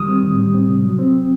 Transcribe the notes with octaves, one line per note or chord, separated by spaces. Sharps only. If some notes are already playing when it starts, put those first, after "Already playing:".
Already playing: D#3 G3 D#6
C4
A2
G3
C4
C3
F#3
C4